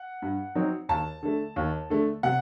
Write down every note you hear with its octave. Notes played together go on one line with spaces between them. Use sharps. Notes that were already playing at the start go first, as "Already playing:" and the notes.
Already playing: F#5
G2
F#3 C4 D#4
D#2 A5
D3 A3
D#2
D3 A3
C3 F#5